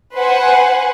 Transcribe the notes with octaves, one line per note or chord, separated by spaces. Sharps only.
B4 C5 F#5 G#5